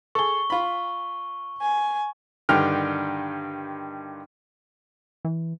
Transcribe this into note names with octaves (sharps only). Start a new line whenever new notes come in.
G#4 A4 C#6 G7
F4 B5
G#5
G2 D3 D#3 G5 F6
E3